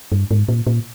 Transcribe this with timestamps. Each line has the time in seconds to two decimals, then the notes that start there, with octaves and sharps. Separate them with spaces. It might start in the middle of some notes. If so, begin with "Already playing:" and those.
0.12 G2
0.31 G#2
0.48 A#2
0.67 A#2